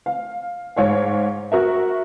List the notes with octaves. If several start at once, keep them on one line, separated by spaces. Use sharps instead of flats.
F5
G#2 C#5 F5
F#4 A#4 E5